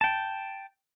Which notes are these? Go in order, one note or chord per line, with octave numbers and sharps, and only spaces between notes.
G5 A5